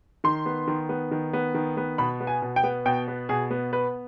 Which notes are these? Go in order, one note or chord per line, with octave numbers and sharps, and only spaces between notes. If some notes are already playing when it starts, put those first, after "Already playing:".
D#3 C6
B3
D#3
B3
D#3
B3
D#3
B3
B2 B5
B3
G#5
B2
G5
B3
B2 G5
B3
B2 G#4
B3
B3 B4